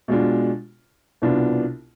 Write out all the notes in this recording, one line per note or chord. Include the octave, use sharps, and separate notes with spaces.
B2 G#3 D4 F4
C2 B2 B3 D4 F4